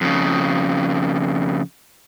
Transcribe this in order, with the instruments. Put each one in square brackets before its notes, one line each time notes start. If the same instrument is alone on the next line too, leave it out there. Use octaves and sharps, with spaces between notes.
[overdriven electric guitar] F2 C#3